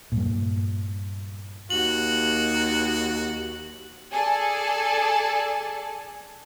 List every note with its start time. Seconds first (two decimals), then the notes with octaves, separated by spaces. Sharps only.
0.12 G2 A#2
1.70 D#2 F#4 F#7
4.11 G#4 A4 D5 G#5 A5